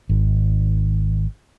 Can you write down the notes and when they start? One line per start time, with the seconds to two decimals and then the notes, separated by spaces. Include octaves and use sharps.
0.09 G#1